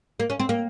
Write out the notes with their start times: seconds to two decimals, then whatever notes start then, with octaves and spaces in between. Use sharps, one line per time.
0.20 A#3
0.30 C#4
0.40 C4
0.49 A#3